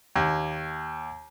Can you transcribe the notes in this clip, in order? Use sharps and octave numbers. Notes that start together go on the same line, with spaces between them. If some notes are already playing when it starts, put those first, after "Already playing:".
D#2